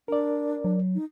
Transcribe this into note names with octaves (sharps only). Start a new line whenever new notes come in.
D4 A#4 D5
F#3
D#4